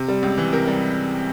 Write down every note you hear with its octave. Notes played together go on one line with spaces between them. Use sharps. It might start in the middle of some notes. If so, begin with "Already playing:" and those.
Already playing: C3
G3
C#2
E3
C3 A#4
G3